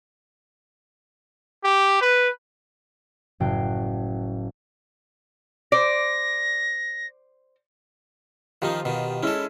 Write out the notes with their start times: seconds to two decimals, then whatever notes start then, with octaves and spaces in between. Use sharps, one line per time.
1.64 G4
2.01 B4
3.40 F#1 A2 F#3 G5 C7
5.72 C5 D5 A#6
8.62 D#3 F3 D#4 F4 G4
8.85 B2 D#3
9.23 G#3 C#4 E4 A4